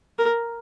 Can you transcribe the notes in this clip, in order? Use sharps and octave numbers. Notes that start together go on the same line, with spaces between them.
A#4